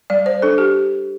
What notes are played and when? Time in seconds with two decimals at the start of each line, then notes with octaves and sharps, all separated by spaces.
0.10 G3 D5
0.26 C5
0.42 D4 A4
0.58 G4